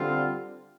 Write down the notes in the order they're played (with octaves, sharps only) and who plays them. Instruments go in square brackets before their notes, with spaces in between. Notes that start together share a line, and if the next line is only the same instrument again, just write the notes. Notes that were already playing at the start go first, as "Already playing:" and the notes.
Already playing: [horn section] D3 G3 C4 F4